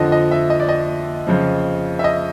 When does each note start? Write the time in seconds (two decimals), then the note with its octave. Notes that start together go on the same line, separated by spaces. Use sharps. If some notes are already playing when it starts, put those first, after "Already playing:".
Already playing: F2 D3 F3 D#5
0.12 D#5
0.31 E5
0.50 D#5
0.60 D5
0.69 D#5
1.27 F2 C#3 F3
1.99 E5
2.04 D#5